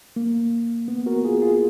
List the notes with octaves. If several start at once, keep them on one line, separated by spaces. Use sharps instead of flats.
A#3
B3
F#4 A#4
F4 G#4
F4 G#4